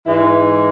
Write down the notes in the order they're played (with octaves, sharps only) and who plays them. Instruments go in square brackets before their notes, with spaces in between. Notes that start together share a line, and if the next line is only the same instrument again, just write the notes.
[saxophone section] G#2 E3 G#3 E4